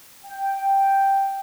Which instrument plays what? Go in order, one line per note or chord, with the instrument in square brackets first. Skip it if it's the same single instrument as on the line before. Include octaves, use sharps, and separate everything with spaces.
[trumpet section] G5